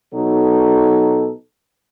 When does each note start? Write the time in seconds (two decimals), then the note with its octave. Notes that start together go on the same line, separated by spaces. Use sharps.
0.14 B2 F#3 D#4 A4